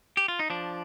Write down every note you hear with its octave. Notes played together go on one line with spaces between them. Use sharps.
G4
F4
D#4
F3 D4